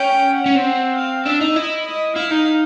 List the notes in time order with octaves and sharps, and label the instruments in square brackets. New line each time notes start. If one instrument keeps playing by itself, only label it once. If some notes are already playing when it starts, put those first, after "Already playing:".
Already playing: [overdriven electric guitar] C#4 [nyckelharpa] G5
[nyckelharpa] F#5
[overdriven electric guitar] C#4
C4
[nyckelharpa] F5
[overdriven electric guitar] D4 [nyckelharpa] E5
[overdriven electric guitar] D#4
[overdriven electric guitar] E4 [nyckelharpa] D#5
[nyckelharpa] D#5
[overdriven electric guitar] E4 [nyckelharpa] F5
[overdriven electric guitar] D#4